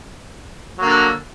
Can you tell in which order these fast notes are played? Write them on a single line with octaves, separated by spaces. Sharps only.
F#3 A#3 D3